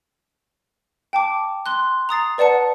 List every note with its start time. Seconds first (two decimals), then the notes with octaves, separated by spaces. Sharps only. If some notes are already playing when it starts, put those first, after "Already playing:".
1.13 G5 A5 D6
1.66 C6 F#6
2.09 A#5 D#6 A6 C7
2.38 B4 D5 F#5 A5 C#7